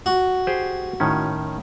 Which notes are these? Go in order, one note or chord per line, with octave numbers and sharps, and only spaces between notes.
F#4
G4 G#4 C5
A2 D#3 C#4